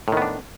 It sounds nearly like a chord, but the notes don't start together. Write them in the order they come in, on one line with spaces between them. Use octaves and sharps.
A2 D#3 B3 D4